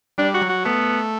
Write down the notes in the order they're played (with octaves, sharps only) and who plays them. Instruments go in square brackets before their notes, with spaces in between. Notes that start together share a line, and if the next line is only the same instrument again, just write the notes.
[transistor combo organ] G3 [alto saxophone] D4
[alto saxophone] F#4
[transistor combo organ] F#3
[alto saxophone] F#4
[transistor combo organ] A3 [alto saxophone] B3